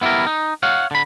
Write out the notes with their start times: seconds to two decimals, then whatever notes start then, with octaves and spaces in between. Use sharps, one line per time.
0.01 B3 E4 F#4 G4 A#4
0.27 D#4
0.63 C#5 F5 F#5
0.91 D3 B5